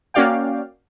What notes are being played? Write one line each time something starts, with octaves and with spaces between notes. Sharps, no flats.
A#3 C#4 F#4 D5 F5 G5